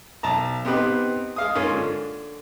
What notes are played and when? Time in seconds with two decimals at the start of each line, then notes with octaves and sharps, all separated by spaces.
0.23 B1 A5 A#5
0.65 B3 C4 D#4 G4 B4
1.36 G#3 F5 D#6
1.55 G#2 A#3 C#4 F4
1.72 D3